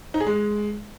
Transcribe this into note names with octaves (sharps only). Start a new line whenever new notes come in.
D#4
G#4
G#3